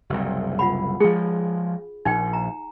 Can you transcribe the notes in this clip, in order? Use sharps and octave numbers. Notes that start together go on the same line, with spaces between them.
F#1 C2
F4 F#5 B5
F3 G#3 G#4
A#1 D#4 G5
A#5